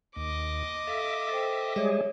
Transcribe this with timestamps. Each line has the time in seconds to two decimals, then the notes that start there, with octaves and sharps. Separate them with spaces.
0.16 D#2 D#5 D6
0.87 A4 E5 F5
1.29 A4 C5 G5
1.76 G3 G#3 G#4 C#5 E5